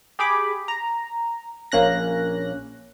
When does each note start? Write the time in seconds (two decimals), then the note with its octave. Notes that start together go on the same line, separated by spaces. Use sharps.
0.19 G4 G#4 B5 D6
0.68 A#5
1.72 A#1 A#3 C#4 F#6 A#6